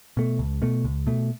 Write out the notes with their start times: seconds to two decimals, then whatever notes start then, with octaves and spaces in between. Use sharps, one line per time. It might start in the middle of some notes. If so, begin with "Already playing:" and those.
0.17 B2 A3
0.39 C#2
0.62 B2 A3
0.84 C#2
1.07 B2 A3